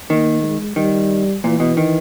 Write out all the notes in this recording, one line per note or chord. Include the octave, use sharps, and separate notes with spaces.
D#3 A#3
G#3
D#3 G3
A#2 E3
B2
D#3